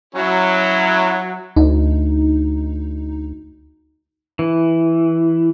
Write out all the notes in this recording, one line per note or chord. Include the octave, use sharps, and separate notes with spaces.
F#3 C#4 E4
D2 D#4
E3